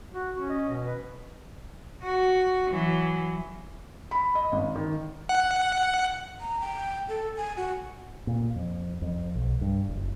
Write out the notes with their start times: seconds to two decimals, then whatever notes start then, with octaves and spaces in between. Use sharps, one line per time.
0.13 F#4
0.35 C#4 F#4
0.49 D#5
0.68 B2
0.86 B4
2.03 F#4
2.71 E3 F#3
4.11 B5
4.35 D#5
4.52 G#1
4.76 D#3
5.29 F#5
6.41 A#5
6.61 G5
7.08 A4
7.37 G#5
7.57 F#4
8.27 A#2
8.56 F2
9.02 F2
9.35 B1
9.61 G2
9.89 F#1